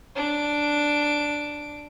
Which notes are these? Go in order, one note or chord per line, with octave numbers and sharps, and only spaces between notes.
D4 D7